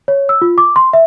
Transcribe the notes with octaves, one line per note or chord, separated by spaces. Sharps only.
C#5
E6
F4
D6
C6
E5